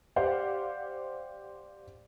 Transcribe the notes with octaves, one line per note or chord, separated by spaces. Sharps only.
G4 C5 D5 F5 F#5